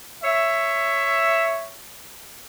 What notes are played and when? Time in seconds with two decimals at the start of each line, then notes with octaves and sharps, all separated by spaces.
0.24 C#5 E5